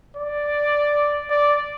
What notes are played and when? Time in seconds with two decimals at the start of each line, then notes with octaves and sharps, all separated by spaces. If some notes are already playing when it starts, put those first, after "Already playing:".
0.17 D5
1.30 D5